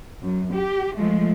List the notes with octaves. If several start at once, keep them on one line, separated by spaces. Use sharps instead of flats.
F#2
G4
F3 G#3 A3